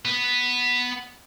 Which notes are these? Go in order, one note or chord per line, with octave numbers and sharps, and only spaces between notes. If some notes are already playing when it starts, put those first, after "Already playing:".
B3